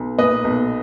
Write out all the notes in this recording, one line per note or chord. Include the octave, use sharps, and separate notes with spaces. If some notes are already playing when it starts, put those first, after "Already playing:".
Already playing: B1
A#2 B4 D#5
B1